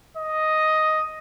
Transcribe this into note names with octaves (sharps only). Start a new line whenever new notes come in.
D#5